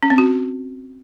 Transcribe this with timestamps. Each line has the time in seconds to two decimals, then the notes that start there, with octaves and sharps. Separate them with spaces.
0.03 C#4
0.10 C4
0.18 F#4